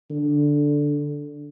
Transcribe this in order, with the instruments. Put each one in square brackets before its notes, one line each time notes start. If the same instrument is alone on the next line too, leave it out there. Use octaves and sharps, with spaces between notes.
[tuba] D3